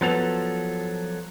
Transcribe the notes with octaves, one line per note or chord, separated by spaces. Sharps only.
F3 F#3 B3 A4 A6 F7